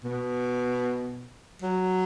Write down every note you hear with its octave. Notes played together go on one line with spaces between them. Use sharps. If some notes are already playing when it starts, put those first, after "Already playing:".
B2
F#3